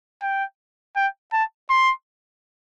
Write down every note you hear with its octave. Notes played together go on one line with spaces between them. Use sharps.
G5
G5
A5
C6